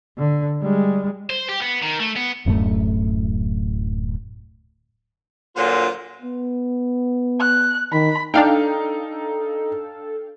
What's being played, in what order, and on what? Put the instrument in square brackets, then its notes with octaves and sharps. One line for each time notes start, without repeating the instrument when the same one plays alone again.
[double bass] D3
G3 G#3
[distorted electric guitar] C5
G4
B3
D#3
A3
B3
[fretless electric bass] D1 F#2 A2 A3
[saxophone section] A#2 D3 F#3 [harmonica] F4 C5
[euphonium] B3
[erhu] F#6
[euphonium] D#3 [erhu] B5
[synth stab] D4 F5 G5 [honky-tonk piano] D#4 [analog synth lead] A4